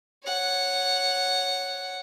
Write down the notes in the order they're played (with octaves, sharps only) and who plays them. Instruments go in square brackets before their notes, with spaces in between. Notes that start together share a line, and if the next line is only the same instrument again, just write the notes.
[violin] C#5 F#5